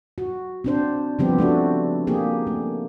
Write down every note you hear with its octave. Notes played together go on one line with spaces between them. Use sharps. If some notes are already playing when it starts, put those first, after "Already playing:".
F#4
C4 D4 C5
C#3 F3 G3 B3 C4 G4
A3 D4 F#4
A#3 G4 G#4
A3